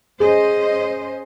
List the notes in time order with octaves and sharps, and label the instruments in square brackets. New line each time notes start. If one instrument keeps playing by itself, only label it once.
[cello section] C#4 C5 D#5 [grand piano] G#4